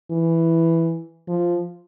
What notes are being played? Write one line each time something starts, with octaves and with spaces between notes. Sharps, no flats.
E3
F3